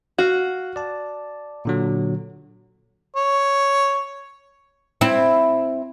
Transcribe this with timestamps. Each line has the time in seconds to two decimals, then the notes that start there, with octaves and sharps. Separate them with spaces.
0.18 F#4 F5 F#6
0.76 D5 A5
1.65 A#2 D3 F#3
3.16 C#5
5.01 C4 E4